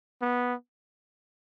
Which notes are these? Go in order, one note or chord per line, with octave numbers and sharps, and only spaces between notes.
B3